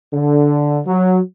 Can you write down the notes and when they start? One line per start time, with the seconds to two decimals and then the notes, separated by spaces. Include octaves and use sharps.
0.14 D3
0.86 F#3